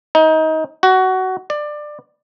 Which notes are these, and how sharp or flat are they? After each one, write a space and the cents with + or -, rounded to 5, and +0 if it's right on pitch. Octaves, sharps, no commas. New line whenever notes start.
D#4 +25
F#4 +20
D5 +20